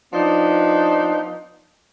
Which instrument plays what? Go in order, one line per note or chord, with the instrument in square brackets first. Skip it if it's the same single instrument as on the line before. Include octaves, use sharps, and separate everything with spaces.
[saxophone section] F3 B3 D4 D#4